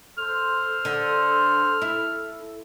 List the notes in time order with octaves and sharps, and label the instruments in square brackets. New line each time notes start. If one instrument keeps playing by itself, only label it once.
[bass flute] A4 [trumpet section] C5 [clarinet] F6
[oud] D3
E4